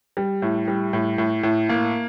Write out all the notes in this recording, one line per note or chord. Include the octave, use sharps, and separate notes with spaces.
G3
A2
G3
A2
A2
A2
A#3